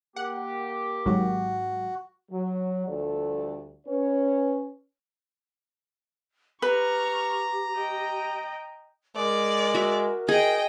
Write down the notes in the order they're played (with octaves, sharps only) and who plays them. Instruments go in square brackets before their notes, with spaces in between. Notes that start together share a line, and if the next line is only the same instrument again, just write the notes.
[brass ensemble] A#3 G4 [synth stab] F#5
[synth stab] G#1 G#2 F#3 [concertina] F#4
[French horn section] F#3
D2 F3 G3 A3 A4 D5
C#4 B4 C#5
[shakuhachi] G4 [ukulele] B4 [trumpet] A#5 [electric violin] C#6 F6
[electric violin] D#5 G5
[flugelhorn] G#3 [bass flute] A#4 [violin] D5
[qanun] F#4 E5
[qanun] G#4 [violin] D#5 G5